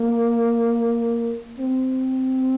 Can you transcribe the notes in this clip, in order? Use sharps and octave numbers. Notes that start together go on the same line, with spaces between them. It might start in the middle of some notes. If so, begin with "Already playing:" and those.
Already playing: A#3
C4